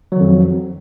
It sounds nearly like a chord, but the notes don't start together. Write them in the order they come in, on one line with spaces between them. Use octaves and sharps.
F#3 D#3 F2